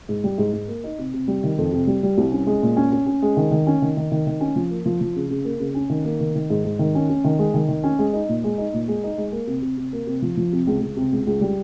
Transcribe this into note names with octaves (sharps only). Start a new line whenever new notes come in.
G#2
G3
G#2
G#2
A#3
D#4
C3
C3
G3
D#3
F2
C3
G3
G3
C2
C#4
G#3
A#2
C#4
C#4
C#4
G#3
D#3
D#3
C#4
D#3
D#3
D#3
D#3
C#4
F3
A#3
F3
F3
C#3
C#3
A#3
C#3
C#4
D#3
A#3
D#3
D#3
G#2
G#2
D#3
C#4
C#4
D#3
G#3
D#3
D#3
C#4
G#3
D#4
A#2
G#3
D#4
A#2
G#3
D#4
G#3
A#3
C3
C3
C3
A#3
C3
F3
F3
C3
C#2
C#2
C3
C#2
C#2
G3